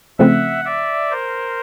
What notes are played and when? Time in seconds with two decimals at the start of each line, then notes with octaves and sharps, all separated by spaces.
0.19 C#3 F3 A3 C4 E5 F#5
0.65 D5 E5
1.11 A#4 C5